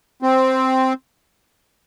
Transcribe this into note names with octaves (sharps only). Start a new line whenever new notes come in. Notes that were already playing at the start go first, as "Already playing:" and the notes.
C4